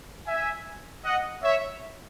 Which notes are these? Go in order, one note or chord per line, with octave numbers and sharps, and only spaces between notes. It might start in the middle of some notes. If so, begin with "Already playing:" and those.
E5 G#5
D#5 F#5
C#5 E5